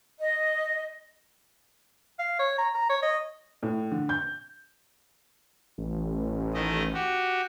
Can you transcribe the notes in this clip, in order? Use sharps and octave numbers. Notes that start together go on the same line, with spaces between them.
D#5
F5
C#5
A#5
A#5
C#5
D#5
A2
D3
G6
A1
D#3 A3 D#5
F#4 G4